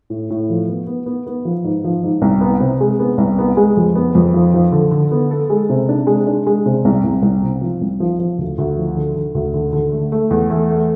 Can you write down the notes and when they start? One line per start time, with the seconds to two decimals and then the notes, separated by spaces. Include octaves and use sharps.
0.10 A2
0.30 A2
0.50 F3
0.68 B3
0.87 B3
1.06 B3
1.26 B3
1.45 F3
1.64 G#2
1.84 F3
2.03 G#2
2.22 C2
2.41 B3
2.60 C3
2.80 G#3
3.00 B3
3.18 C2
3.38 B3
3.57 G#3
3.77 F2
3.95 B3
4.15 F2
4.34 F3
4.54 F3
4.72 D3
4.91 D3
5.12 B3
5.31 A4
5.50 G#3
5.70 C3
5.89 D4
6.07 G#3
6.27 D4
6.47 G#3
6.66 C3
6.85 C2
7.04 C2
7.22 C2
7.43 C3
7.61 F3
7.81 C2
8.00 F3
8.19 F3
8.38 D2
8.58 D2
8.76 F3
8.97 D3
9.15 D3
9.35 D2
9.54 D3
9.73 D3
9.92 A3
10.12 A3
10.31 E2
10.50 A3
10.69 A3